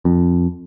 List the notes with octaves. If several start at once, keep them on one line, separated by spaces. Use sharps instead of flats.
F2